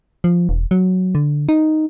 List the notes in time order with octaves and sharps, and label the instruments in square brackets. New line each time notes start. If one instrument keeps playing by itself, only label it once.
[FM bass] F3
E1
F#3
D3
D#4